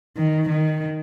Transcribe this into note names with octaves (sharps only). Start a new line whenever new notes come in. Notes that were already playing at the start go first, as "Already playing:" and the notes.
D#3
D#3